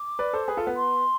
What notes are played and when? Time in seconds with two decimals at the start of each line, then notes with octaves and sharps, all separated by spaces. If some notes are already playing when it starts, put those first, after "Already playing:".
Already playing: D6
0.19 B4 D5
0.33 A4 C5
0.48 G#4 B4
0.57 F4 A4
0.67 B3
0.76 C6